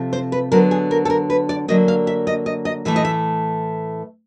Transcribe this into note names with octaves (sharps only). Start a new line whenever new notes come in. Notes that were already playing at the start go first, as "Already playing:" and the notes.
Already playing: C3 F3 A3 C4
C5
B4
D3 F#3 B3 A#4
G#4
A#4
A4
A#4
B4
D5
D3 F#3 A#3 D#5
F5
E5
D#5
D#5
D#5
A2 E3 A3 E5
D#5
E5